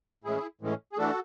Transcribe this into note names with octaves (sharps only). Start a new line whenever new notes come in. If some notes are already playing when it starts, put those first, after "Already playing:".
A2 E3 G#3 C#4 E4 G#4
A2 E3 G#3 C#4
G#4
E3 A3 D4 F#4 A4